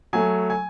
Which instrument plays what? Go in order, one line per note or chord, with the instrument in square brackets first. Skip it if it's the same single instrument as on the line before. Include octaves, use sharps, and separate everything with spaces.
[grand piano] F#3 A3 G#5
G#5